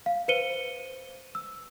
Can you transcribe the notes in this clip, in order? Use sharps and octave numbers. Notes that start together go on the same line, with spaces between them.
F5
B4 C5 C#7 D#7 G7
E6